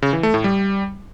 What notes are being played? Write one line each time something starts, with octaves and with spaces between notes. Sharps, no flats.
C#3
E3
A3
A2
G3